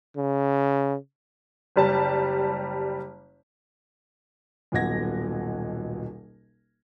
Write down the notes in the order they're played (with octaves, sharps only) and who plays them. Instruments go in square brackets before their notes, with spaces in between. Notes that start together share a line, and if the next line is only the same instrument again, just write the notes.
[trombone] C#3
[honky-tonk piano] F#1 G3 A5
[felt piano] D#1 B1 B2 F#5 G#6 A#6